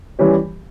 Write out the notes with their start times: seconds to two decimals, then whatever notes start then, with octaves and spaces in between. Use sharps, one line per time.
0.19 E3 G3 C#4 G4 C#5